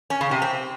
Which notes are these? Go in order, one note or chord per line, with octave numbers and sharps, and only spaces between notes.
C#4
C#3
C3
C4